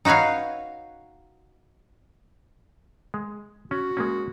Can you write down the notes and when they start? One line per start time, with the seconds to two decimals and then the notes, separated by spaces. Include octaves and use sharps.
0.05 D#4 F#4 B4 C#5 F5
3.14 G#3
3.71 C#4 F#4
3.97 G#3 A#3 C#4